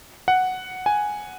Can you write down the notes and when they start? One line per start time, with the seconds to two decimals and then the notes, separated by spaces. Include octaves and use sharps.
0.28 F#5
0.86 G#5